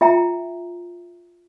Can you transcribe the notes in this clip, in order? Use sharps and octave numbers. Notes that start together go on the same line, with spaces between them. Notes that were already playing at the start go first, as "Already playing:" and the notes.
F4 E5 G5 A#5